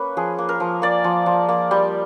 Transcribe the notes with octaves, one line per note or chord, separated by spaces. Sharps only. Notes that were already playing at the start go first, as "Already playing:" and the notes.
Already playing: A#3 C#4 B4
F3 G#4
A#3
A#4
F3
A#3 D5
F3
F3
A#3
G3